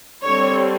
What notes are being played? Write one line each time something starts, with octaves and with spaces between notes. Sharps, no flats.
D3 G3 C4 C#5